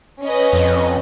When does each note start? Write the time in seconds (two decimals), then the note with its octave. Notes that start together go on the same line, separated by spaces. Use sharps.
0.23 C#4 B4 D#5
0.53 F2